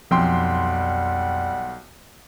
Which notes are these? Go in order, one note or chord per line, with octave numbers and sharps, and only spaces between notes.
B1 F2 G3 F#5 G5 C6